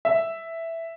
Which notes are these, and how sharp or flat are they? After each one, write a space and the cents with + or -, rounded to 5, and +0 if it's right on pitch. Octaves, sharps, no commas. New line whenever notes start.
E5 +0